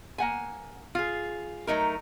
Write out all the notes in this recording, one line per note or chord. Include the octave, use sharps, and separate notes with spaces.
A#3 F#5 G#5
F4 G#4
F#3 A3 D#4 A#4